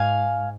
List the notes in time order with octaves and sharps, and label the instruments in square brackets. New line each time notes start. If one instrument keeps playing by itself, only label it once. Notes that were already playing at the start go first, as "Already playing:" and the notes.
Already playing: [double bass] G#2 [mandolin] F5 G#5